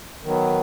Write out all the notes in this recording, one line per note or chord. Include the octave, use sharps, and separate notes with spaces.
D#3 F#3 B3